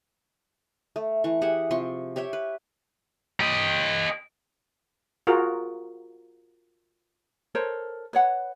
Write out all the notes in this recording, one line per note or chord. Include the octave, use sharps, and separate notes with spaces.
A3
E3 C#6
G4 G#4 E5 F#5
C3 F3 C6 C#6
G4 C#5 E5 G5
B4
G4 D#5
F4 F#4 G#4 A#4
A4 A#4 C5 C#5
B4 C#5 F#5